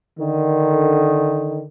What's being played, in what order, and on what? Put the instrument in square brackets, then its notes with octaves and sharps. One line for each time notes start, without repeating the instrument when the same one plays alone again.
[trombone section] D3 D#3